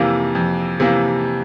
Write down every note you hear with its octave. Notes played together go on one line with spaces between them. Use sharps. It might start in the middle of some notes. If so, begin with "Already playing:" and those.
Already playing: F2 C3 E3 A#3
F2
C3 E3 A#3